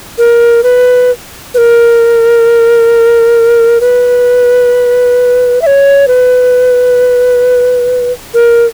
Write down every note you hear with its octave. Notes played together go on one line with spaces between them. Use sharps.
A#4
B4
B4
A#4
B4
E5
C#5
B4
A#4